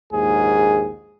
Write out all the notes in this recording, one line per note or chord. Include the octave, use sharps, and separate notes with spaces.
A#1 D#2 G#2 G#4